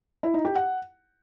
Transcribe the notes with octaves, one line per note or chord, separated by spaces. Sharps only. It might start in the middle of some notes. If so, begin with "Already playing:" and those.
E4
D#4
G4
F#5